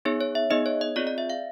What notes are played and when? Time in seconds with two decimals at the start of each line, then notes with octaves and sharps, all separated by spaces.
0.05 B3 D#4 G#4 C#5
0.21 C#5
0.35 E5
0.50 B3 D#4 G#4 D#5
0.66 C#5
0.81 D#5
0.96 C4 F4 G#4 D5
1.07 D5
1.18 E5
1.30 F5